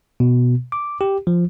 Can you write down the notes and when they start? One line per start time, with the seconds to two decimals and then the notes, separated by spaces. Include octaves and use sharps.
0.20 B2
0.72 D6
1.01 G4
1.27 F3